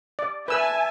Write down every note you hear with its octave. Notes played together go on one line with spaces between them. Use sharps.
D5
B4 E5 G#5 A5 E6